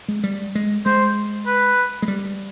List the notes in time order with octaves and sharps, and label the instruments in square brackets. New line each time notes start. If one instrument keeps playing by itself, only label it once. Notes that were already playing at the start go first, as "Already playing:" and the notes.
[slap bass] G#3
G3
G#3
[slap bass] G#3 [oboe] C5
[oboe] B4
[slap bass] G#3
G3